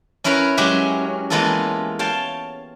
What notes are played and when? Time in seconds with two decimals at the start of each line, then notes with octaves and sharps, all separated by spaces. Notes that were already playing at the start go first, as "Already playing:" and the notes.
0.24 C#4 E4 A#4 B4 C#5 A#5
0.57 F#3 G#3 C#4 F#4 G4 E5
1.30 E3 G#3 A#3 B3 F4 A4
1.99 C#5 F5 G5 A5